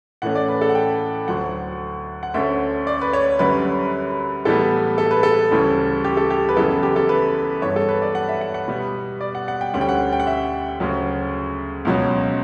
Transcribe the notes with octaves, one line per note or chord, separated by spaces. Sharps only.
A2 E3 A3 C#4 F#5
D5
B4
A4
F#5
G5
D2 D3 F#3 F#5
F#5
D2 D3 A3 C#4 E5
D5
B4
C#5
F#2 D3 G3 C#4 B4
A2 E3 G3 B3 A4
A4
B4
A4
D2 C#3 E3 G3
G4
A4
G4
B4
F#2 C#3 E3 B3 A4
G4
A4
B4
G2 E3 B3 C#5
A4
B4
D5
F#5
E5
F#5
F#5
B2 G3 B3
D5
F#5
F#5
G5
D2 D3 G3 C#4 F#5
G5
F#5
G5
F#5
E5
D2 C#3 F#3 C#4
C#2 B2 F#3 C#4